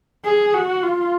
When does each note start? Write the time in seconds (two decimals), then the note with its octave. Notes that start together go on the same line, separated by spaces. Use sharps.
0.25 G#4
0.54 F#4
0.83 F4